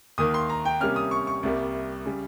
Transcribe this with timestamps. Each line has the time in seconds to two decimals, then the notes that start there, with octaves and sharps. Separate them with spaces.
0.18 D#2 D#3 A#3 D#6
0.34 C6
0.49 A#5
0.65 G5
0.81 C3 G3 A#3 C#4 F6
0.96 D#6
1.11 C#6
1.27 C#6
1.43 C2 C3 G3 A#3
2.05 C#3 G3